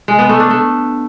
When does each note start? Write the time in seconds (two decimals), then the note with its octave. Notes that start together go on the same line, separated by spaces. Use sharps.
0.08 G#3
0.19 B3
0.29 A3
0.40 D4
0.50 A3